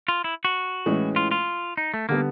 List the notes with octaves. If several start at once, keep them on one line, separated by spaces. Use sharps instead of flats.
F4
E4
F#4
A2 E3 G#3 C#4
F4
F4
D#4
A3
D3 G3 A#3 B3